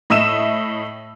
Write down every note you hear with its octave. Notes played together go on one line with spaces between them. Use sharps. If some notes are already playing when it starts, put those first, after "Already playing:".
A2 D#5 E5 E6 D#7 E7